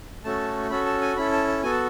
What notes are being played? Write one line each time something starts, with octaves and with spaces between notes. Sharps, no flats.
A3 C#4 F#4 A4 A5
C#4 F#4 A4 B5
A5
G#5
C#4 E4 A4 B5
A5
A5
B3 F#4 A4 G#5
A5